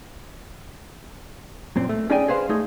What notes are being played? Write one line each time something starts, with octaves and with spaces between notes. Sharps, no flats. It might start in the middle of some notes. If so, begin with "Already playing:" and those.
F#2 A#2 C4
A3
C#4 D#4 G#4 D5 G5 G#5
G#4 B4 C5 F5
A3 D#4 G#4